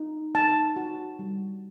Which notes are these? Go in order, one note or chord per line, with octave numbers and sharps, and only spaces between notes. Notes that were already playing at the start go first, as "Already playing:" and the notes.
Already playing: D#4
D#4 A5
F#4
G3